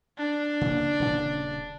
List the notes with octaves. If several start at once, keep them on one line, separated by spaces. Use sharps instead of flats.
D4
C#3 A#3
D#1 C#3